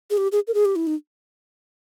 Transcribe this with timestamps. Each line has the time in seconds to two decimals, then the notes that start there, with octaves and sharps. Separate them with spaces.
0.10 G#4
0.18 G4
0.32 G#4
0.47 A#4
0.54 G#4
0.65 G4
0.76 E4
0.87 D#4